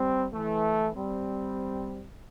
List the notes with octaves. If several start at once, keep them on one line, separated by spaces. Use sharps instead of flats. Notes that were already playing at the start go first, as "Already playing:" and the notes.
Already playing: G3 C4
E3 A3
G3 C4